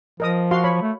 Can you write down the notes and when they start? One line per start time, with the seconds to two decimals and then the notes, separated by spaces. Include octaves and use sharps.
0.20 F3 A#4 D#5 D#6
0.51 F#4 F5 C6
0.64 C#5 B5
0.82 A3